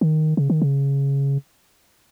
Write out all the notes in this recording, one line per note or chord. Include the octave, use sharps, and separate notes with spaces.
D#3
C#3
D#3
C#3